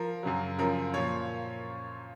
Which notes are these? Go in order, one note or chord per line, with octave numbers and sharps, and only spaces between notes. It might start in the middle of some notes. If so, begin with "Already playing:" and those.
Already playing: F3 A#4
F#2 C#3 F#3
F#2 C#3 F3 A#4
A#2 F3 C#5